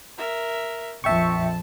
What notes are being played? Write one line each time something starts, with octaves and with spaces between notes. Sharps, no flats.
A#4 E5
A#1 F2 F3 E5 G5 A5 C#6